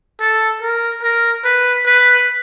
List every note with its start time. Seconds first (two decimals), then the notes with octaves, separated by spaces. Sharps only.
0.20 A4
0.62 A#4
1.03 A#4
1.45 B4
1.86 B4